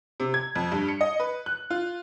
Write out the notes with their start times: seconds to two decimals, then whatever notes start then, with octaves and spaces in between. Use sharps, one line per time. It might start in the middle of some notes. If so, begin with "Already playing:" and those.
0.20 C3
0.34 G#6
0.55 F2
0.72 G2
0.89 C#7
1.01 D#5
1.20 B4
1.46 F#6
1.70 F4